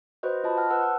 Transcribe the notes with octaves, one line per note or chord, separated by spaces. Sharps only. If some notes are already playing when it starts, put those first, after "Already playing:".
F#4 B4 C5 D#5
F4 D#5 A5 B5
F#5 A5 F6
B4 C5 F#5 E6
F#5